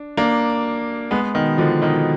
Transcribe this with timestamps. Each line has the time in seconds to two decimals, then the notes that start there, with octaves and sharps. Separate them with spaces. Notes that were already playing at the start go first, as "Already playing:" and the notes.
Already playing: D4
0.17 A#3 D4
1.11 G#3 B3
1.34 B2 D#3
1.58 D3 F3
1.82 B2 D#3